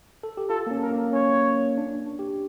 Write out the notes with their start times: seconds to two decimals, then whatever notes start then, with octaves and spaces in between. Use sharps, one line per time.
0.23 A4
0.37 G4
0.49 F4 A4
0.67 A#3
0.71 C#4
0.82 A#4
0.92 A#3
1.13 C#4 C#5
1.78 D4
2.19 G4